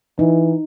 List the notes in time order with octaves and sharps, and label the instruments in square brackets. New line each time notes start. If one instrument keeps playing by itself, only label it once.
[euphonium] E3 [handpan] D#4